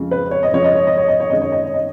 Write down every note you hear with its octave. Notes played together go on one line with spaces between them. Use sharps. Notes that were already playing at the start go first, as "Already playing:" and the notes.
Already playing: F2 C#3 F3 G#3
B4
C#5
D#5
F2 C#3 F3 G#3 C#5
D#5
C#5
D#5
C#5
D#5
C#5
F#2 D#3 G#3 D#5
C#5
D#5
C#5
D#5